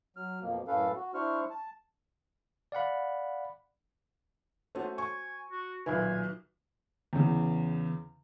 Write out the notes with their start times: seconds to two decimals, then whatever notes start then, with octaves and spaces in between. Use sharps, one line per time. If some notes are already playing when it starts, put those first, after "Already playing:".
0.17 F#3 F6
0.42 F2 B2 F3 A#3
0.68 F#2 A2 C#4 A4 B4 F5
0.96 F#4
1.14 D4 E4 C5 C#6 F6
1.50 A5
2.72 D5 F5 F#5 B5
4.75 A3 C#4 F#4 C5
4.98 G#5 C#6
5.50 F#4
5.86 B1 A#2 D#3 B4 E5 G#5
7.13 E2 C#3